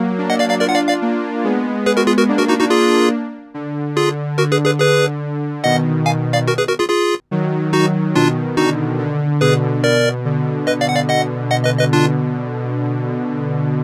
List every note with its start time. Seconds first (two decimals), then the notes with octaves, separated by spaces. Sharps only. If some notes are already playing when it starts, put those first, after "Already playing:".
Already playing: F#3 A#3
0.18 A#3 D4
0.30 D#5 F#5
0.39 D5 F5
0.49 D5 F5
0.60 D4 F4 A#4 D5
0.69 F#5
0.74 D5 F5
0.88 D5 F5
1.02 A#3 D4
1.44 G#3 B3
1.86 G#4 B4
1.97 F#4 A#4
2.07 F4 G#4
2.18 F#4 A#4
2.28 A#3 D4
2.38 F#4 A#4
2.49 D#4 F#4
2.60 D#4 F#4
2.70 A#3 D4 F4 G#4
3.54 D3
3.95 D3 F4 G#4
4.38 D3 F#4 A#4
4.52 G#4 B4
4.65 G#4 B4
4.80 D3 G#4 B4
5.64 B2 D#3 D#5 F#5
6.06 F5 G#5
6.33 D5 F5
6.48 F#4 A#4
6.58 G#4 B4
6.68 F#4 A#4
6.79 F4 G#4
6.89 F4 G#4
7.31 D#3 F#3
7.73 D#4 F#4
8.15 B2 D#3 D4 F4
8.57 D3 D#4 F#4
8.99 D3
9.41 B2 G#4 B4
9.84 A#4 D5
10.25 D3
10.67 B4 D#5
10.81 D5 F5
10.89 F#5
10.95 D5 F5
11.09 D#5 F#5
11.51 D#5 F#5
11.65 B4 D#5
11.79 B4 D#5
11.93 D4 F4